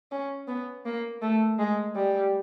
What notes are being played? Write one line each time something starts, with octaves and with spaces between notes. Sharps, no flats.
C#4
B3
A#3
A3
G#3
G3